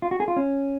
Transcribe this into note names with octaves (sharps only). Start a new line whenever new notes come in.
F4
F#4
G#4
F4
C#4